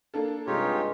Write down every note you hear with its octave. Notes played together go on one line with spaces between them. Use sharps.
A#3 D4 A4
G2 C3 G#3 D#4 F4 G4 C#5